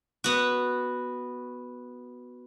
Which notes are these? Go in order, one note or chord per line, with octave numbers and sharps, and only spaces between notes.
B3 F#4